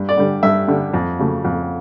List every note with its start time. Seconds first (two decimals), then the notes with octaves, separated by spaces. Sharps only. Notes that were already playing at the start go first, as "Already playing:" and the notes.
Already playing: G2
0.09 D5
0.18 D3 G3
0.43 G2 E5
0.68 D3 G3
0.94 F2
1.19 C#3 F#3 A3
1.45 F2